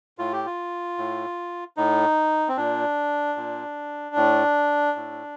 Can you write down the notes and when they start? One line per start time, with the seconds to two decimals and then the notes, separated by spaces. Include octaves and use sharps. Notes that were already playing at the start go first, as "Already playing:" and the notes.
0.18 A2 F4
0.32 G4
0.46 F4
0.98 A2
1.77 A2 D#4
2.48 C4
2.57 A#2 D4
3.36 A#2
4.16 A2
4.95 A2